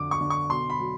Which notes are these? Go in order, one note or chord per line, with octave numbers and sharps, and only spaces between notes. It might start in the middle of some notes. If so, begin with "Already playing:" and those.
Already playing: F2 D3 D6
C#6
D3
C#6
B2 C6
B5
F#3